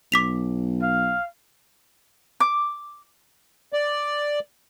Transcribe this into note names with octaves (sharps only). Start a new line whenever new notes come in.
B1 D6 B6 F7
F5
D6
D5